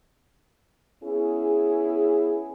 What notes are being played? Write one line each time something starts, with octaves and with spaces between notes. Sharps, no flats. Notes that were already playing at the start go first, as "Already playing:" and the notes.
B3 C#4 E4 G#4